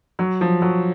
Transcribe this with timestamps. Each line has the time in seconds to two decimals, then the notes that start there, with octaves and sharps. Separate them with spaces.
0.19 F#3
0.41 F3
0.62 F#3